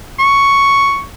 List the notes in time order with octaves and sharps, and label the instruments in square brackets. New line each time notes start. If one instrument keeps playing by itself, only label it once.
[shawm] C#6